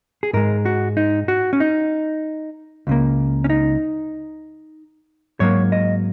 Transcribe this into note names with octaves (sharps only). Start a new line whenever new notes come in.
G#4
G#2 G#3 A#4
F#4
D#4
F#4
C#4
D#4
C#2 C#3 A#3
C#4
D#4
G#2 F#3 A#3 C#5
D#5